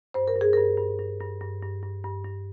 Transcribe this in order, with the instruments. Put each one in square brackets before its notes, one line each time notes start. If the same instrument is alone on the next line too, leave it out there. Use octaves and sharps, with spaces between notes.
[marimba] G2 C5
A#4
G2
G#4
G2 A#4
G2
G2
G2
G2
G2
G2
G2
G2